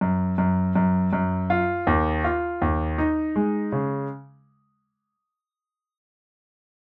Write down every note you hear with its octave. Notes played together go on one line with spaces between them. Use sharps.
F#2
F#2
F#2
F#2
F4
D#2
F4
D#2
D#4
G#3
C#3